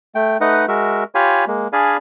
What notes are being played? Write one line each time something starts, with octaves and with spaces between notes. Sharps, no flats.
A3 G5
A3 D#4 B4 D#5 F#5
G#3 F#4 A#4 E5
F4 G4 C#5 F5 G#5 B5
G#3 A#3
D4 G#4 D5 F5 G#5 B5